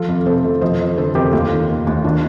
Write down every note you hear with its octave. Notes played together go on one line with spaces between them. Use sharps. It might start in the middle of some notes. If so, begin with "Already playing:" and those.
Already playing: F3 F4 A4
F2
C3 A4 C5
F2
F3 C5 D#5
F2
D3 A4 C5
F2 G4 A#4
D#2 F4 A4
D#3
D#3
D#2
D#3 D4 F4